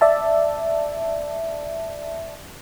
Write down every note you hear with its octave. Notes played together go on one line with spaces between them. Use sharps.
D5 E5 A5